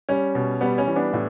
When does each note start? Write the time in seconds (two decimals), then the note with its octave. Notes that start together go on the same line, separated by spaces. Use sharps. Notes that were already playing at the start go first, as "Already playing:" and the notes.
0.09 G3 C#4
0.35 B2
0.61 G3 B3
0.78 C#4
0.87 E3
0.96 B3 D4
1.13 A2